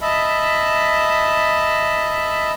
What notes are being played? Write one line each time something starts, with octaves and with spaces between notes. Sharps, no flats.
D#5 E5 A5 B5